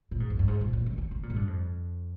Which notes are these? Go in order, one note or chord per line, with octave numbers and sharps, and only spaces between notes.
A#2
G#2
F2
G2
G#2
A#2
A#2
C3
D3
C3
A#2
G#2
G2
F2